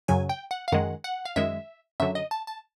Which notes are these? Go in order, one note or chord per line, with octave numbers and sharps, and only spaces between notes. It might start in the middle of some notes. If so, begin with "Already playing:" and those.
F#2 C#3 F#3 G#5
G5
F#5
F5
F#2 D#3 G#3 F#5
F#5
F5
F#2 D#3 G#3 E5
F#2 D3 F#3 E5
D#5
A5
A5